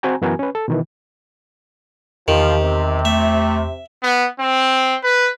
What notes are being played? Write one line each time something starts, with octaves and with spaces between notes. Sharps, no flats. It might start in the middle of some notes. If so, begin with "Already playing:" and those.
C4 F#4 C5 G5 G#5 A#5
F#2 E3 B3 F#4 A#4 G#5
C#4 B4
A4
B2 D#3 E3
E2 D#3 F3 G4
C3
A3 E5
B3
C4
B4